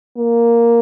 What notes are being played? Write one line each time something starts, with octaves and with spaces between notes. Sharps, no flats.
A#3